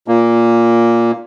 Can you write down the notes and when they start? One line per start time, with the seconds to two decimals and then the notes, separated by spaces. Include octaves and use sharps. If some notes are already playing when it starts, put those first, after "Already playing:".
0.08 A#2 A#3